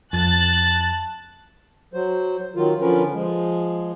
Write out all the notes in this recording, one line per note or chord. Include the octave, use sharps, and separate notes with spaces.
F2 A5 F#6 A6
F#3 C5
D#3 F#3 F4
D3 F3 C#4 F4 A#4 B4
F3 G#3